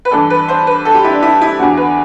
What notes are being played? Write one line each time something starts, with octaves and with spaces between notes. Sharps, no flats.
B4
G2 E3 A4
B4
C5
B4
A4
G4
E4
D4
E4
E4
E2 D3 F#4
B4